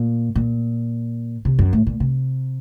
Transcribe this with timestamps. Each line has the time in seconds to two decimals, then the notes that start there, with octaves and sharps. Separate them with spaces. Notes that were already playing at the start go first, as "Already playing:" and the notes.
Already playing: A#2
0.35 A#2
1.45 C3
1.59 F#2
1.73 A2
1.87 A#2
2.00 C3